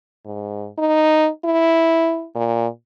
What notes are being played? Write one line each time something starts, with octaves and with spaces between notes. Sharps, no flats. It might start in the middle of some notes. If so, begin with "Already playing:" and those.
G#2
D#4
E4
A#2